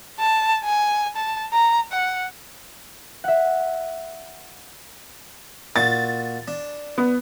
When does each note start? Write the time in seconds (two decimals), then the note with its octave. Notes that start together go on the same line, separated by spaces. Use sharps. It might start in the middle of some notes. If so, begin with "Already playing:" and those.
0.19 A5
0.64 G#5
1.16 A5
1.53 A#5
1.92 F#5
3.24 E5 F#5
5.76 A#2 F#4 A6
6.48 D4
6.98 B3